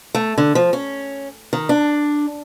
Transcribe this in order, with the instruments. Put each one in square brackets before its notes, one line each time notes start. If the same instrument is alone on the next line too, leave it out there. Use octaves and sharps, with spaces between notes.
[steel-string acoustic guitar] A3
D3
F3
C#4
D#3
D4